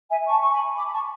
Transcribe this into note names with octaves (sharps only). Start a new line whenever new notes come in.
E5 G#5
A5 C#6
C#6
G#5 B5
B5 D6
B5
A5 C#6